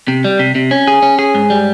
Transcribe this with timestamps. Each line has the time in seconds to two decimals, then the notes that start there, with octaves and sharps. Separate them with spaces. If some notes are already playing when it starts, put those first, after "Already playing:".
0.08 C3
0.24 G3
0.39 C3
0.55 C3
0.71 C#4
0.88 G#4
1.02 C#4
1.19 G#4
1.34 G#2
1.50 G3